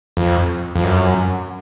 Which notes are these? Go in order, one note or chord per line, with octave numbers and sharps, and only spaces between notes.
F2
F2
F#2